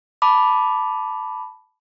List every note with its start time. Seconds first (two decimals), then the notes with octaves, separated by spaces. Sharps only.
0.22 A5 B5 D6